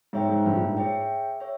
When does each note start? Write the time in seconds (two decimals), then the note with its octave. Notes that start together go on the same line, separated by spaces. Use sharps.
0.13 G#2 G#4 C#5 E5 G5
0.29 G#2
0.46 G2
0.56 A#2
0.61 G#2
0.77 G#4 C#5 E5 G5
1.40 C#5 E5